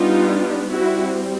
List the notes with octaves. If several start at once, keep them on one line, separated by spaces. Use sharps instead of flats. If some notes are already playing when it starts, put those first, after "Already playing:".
Already playing: G3 B3 D4 D#4 F4
G3 C4 E4 F#4